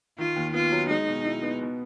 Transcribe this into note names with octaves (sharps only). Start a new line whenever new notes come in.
D#3 F4
D#2
B3 F4
F#3
G#3 D#4
B2
E4
B3
B2